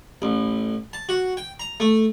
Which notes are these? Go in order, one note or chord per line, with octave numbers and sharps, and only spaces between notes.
A1
A5
F#4
G5
A#5
A3